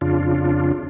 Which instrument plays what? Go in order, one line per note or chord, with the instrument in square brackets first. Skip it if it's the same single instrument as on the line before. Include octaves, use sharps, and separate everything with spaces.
[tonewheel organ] F2 C#3 D4 F4